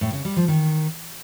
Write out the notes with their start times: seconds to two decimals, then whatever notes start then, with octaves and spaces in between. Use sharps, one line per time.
0.01 A2
0.13 C#3
0.25 G3
0.36 F3
0.48 D#3